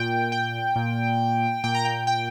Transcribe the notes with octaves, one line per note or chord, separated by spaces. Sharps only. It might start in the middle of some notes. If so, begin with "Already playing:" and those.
Already playing: A#2 G5
G5
A#2
A#2 G5
A#5
G5
G5